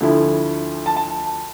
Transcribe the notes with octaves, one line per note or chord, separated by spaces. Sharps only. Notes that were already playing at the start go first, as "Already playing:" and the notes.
D2 D3 F3 A3 E4
A5
A5